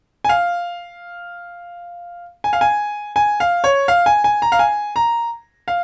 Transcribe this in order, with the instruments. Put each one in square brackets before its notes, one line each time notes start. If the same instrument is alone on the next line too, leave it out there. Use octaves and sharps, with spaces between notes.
[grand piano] G#5
F5
G#5
F5
G#5
G#5
F5
C#5
F5
G#5
G#5
A#5
F5
G#5
A#5
F5